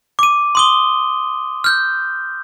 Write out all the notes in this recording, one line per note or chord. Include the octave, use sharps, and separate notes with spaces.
D6 D#7
C6 D#6 G7
F6 G6